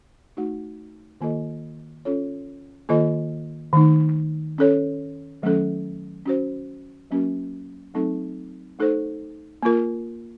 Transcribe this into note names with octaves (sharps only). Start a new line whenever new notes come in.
A3 D#4 F#4
D#3 A#3 F4 A4 D#5
C#4 F4 A4 C#5
D#3 A#3 F4 A4 D#5
D#3 A3 D#4
C#4 A4 C#5
D#3 F#3 A3 C#4 A4
C#4 F#4 C5
F#3 A#3 C#4 F#4 A#4
F#3 A3 C4 D#4 A4
A3 D#4 A4 C5
A#3 F4 A#4